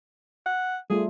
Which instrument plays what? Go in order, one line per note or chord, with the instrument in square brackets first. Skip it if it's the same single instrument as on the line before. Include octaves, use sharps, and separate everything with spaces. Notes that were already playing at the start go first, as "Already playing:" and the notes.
[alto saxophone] F#5
[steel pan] G3 A3 F4 [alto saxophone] G#4